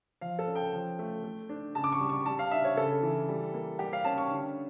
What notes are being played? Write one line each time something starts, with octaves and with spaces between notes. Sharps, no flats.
F3 F5
A4
C#4
G5
F3
A3
A3
D4
C#3 A5
D6
C#6
G3
C#6
G3 A5
F5
D4 E5
C#5
C#3 A4
E3
G3
A#3
G3 G4
F5
C#4 A5
C#6
D3